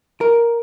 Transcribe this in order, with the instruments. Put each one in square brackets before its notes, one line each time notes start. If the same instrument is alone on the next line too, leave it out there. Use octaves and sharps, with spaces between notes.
[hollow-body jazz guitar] A#4